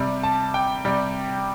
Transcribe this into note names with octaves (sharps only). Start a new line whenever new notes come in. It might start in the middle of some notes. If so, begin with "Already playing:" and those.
Already playing: C3 G3
A5
G5
C3 G3